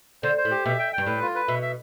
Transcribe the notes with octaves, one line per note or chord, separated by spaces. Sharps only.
D3 C5
C5
A2
G4
B2 E5
G5
G2 G5
A2 B4
F4
B4
B2 E5
E5